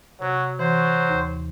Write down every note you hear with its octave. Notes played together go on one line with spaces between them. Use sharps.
C3 F#3 F#4
E3 F#3 C5
D#2